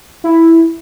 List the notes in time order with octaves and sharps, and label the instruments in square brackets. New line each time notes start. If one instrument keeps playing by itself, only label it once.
[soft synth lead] E4